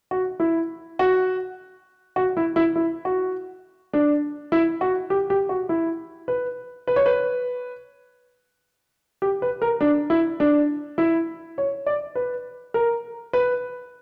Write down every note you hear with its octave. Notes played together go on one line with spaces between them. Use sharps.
F#4
E4
F#4
F#4
E4
E4
E4
F#4
D4
E4
F#4
G4
G4
F#4
E4
B4
B4
C#5
B4
G4
B4
A#4
D4
E4
D4
E4
C#5
D5
B4
A#4
B4